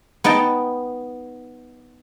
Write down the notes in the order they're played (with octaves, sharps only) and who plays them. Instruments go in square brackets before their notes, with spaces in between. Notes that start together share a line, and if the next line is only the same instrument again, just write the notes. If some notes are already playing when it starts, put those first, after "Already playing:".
[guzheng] B3 D#4 D#5 G5 A5